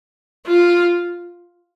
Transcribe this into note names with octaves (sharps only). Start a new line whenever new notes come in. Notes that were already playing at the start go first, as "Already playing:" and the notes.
F4